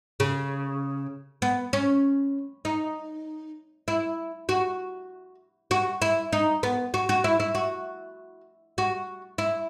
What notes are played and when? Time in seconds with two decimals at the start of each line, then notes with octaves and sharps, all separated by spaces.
0.20 C#3
1.42 B3
1.73 C#4
2.65 D#4
3.88 E4
4.49 F#4
5.71 F#4
6.02 E4
6.33 D#4
6.63 B3
6.94 F#4
7.09 F#4
7.24 E4
7.40 E4
7.55 F#4
8.78 F#4
9.38 E4